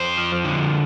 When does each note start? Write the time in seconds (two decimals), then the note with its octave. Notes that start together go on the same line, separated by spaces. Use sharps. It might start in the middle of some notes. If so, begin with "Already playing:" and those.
Already playing: F2 C5
0.17 F3
0.45 D3